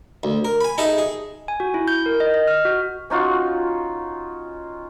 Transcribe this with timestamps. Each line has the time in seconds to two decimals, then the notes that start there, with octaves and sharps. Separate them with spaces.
0.23 D2
0.45 A#4
0.61 G#5 B5
0.78 D#4 G#4 A4 D#5 E5
0.98 G#4
1.48 G#5
1.60 F#4
1.74 E4
1.88 G6
2.06 A#4
2.20 D#5
2.34 D#5
2.47 F6
2.65 F#4
3.10 C#4 D#4 F4 F#4